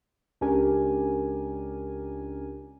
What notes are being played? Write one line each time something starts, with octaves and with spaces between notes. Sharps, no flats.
C#2 C#4 D4 G4 A#4 G#5